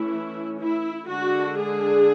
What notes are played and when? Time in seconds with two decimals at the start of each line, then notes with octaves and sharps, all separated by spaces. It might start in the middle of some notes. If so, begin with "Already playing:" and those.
Already playing: E3 A3 C#4 E4
0.58 E4
1.08 D3 G#3 D4 F#4
1.58 G#4